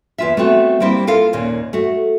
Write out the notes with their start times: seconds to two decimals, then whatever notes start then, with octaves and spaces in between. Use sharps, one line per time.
0.18 E2 F4 E5
0.37 A3 B3 C4 F#4
0.80 G3 A#3 C4 E4
1.07 F4 A4 A#4 F5
1.33 D#2 A#2 C#4
1.73 A3 F#4